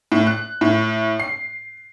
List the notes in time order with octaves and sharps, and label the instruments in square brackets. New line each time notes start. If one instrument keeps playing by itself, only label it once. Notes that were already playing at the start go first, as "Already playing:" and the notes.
[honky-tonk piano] A2
F#6
A2
C7